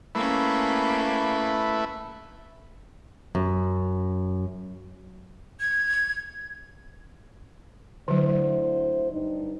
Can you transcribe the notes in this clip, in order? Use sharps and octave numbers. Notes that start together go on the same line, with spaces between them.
A3 A#3 C#4 E4 B4
F#2
G#6
D2 D3 F#3 E4 C5
G2 D#4